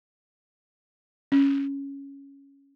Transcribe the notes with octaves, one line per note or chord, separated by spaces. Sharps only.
C#4